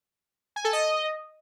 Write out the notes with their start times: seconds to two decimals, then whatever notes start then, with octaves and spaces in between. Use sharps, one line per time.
0.56 G#5
0.64 A4
0.73 D#5